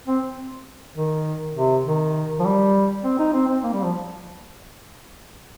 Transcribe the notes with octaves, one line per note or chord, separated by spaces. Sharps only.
C4
D#3
C3
D#3
F3
G3
C4
D#4
C4
C4
A#3
G3
F3